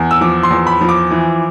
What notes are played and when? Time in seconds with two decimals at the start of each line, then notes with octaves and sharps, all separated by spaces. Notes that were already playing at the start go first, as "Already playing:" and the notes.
Already playing: E2
0.11 E6
0.21 F3 D6
0.43 C6
0.50 E2
0.67 B5
0.81 F3
0.89 D6
1.11 E3